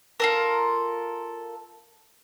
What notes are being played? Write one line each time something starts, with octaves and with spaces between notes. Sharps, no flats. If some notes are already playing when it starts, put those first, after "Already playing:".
F4 A4 A#4